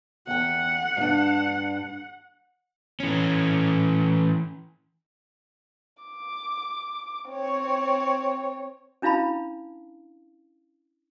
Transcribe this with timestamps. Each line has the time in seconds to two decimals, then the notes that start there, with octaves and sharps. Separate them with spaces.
0.27 E2 F#5 G5
0.97 G2 D4
3.00 E3 C#4
6.03 D6
7.30 C4 C#5
9.02 C#4 D4 E4 F5 A5 B5